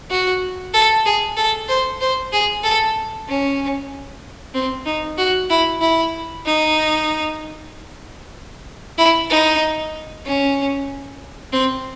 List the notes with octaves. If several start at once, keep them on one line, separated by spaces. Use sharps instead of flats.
F#4
A4
G#4
A4
C5
C5
G#4
A4
C#4
C4
D#4
F#4
E4
E4
D#4
E4
D#4
C#4
C4